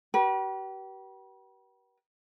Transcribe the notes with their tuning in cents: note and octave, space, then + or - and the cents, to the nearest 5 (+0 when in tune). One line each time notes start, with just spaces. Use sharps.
G4 -40 B4 -40